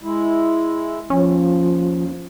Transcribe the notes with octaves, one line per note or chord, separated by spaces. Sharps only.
G#3 E4
D#2 F3 C#4